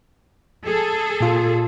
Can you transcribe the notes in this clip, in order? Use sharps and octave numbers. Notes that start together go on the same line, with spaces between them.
G#4 A4
A#2 F4